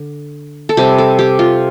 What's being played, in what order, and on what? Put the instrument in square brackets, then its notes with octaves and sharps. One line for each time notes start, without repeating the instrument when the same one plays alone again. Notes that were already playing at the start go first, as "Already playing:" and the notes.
Already playing: [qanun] D3
A4
C3 G3 G4
A4
G4
F4